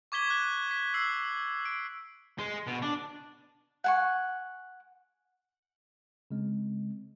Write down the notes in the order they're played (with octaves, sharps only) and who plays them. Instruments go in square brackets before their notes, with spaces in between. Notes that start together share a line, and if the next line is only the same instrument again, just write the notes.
[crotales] C#6 D6 G#6 B6 G7
F#6
B6
E6 C7 F#7
D7
[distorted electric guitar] G#3
B2
D4
[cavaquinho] F#5 G#5 C#6
[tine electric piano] C#3 G#3 C4